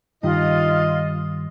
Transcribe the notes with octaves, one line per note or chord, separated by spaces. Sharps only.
G2 D#3 F4 D#5